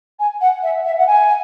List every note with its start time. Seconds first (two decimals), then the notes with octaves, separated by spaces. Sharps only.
0.19 G#5
0.41 F#5
0.63 E5
0.85 E5
0.98 F#5
1.07 G#5